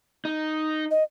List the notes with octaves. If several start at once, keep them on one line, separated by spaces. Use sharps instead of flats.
D#4
D#5